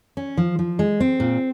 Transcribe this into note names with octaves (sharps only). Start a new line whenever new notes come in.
C#4
F3
F3
G#3
C4
A#2